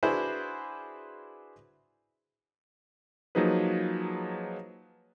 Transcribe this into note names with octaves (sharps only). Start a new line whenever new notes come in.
D4 E4 F#4 G#4 B4 C5
F3 F#3 A#3 D#4 G#4 B4